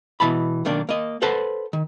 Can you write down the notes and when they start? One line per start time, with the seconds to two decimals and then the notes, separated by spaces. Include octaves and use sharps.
0.20 B2 E3 A5 B5
0.65 B1 D#3 A#3 D4
0.89 A#3 D#5
1.22 A4 B4 C5 F#5 A5
1.73 D#3